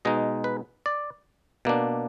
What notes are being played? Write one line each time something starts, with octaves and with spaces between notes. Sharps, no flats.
B2 G#3 D#4 D#5
B4
D5
B2 A#3 D4